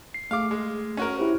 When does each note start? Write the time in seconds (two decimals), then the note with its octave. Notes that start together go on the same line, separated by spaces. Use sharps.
0.14 C7
0.31 A3 G#4 F5 D6
0.51 G#3
0.97 C#4 F#4 A#4
1.18 E4 G4 C5